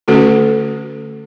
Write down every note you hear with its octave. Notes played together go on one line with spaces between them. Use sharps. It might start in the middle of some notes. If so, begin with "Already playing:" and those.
D3 A3 C#4 F#4 A4